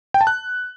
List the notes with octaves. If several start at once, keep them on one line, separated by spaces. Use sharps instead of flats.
G5
A5
F#6